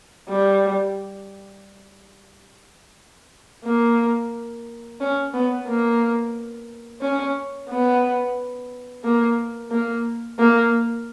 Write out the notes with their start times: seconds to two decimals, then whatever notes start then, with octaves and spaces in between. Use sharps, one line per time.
0.29 G3
3.65 A#3
5.00 C#4
5.34 B3
5.67 A#3
7.02 C#4
7.69 B3
9.04 A#3
9.71 A#3
10.39 A#3